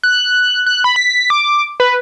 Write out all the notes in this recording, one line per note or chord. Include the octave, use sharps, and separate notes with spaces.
F#6
F#6
B5
B6
D6
B4